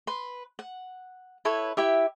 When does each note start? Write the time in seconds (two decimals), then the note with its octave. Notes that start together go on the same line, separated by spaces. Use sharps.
0.07 B4 C6
0.59 F#5
1.45 E4 A4 B4 C#5
1.77 E4 G4 E5